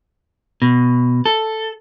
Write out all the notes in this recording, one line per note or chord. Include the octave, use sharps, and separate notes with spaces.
B2
A4